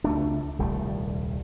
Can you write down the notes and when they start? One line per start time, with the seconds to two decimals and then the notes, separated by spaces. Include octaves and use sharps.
0.04 C#2 A3 D4
0.59 D#1 C2 G3 A3